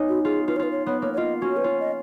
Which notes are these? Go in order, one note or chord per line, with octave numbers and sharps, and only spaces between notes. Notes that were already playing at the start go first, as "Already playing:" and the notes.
Already playing: B3 C#4 D#4
F#4
F4 G#4
F4 B4
C#5
F4 B4
C#5
B3 C#5
A#3 C#5
C#5
F4 D#5
C#4 F#4
B4
F4 C#5
D#5